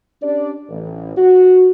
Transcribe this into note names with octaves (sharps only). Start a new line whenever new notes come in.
C#4 D4 G4 D5
A1
F#4